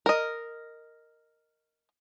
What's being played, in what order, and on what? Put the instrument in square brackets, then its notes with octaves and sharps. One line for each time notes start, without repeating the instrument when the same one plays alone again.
[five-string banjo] A#4 D#5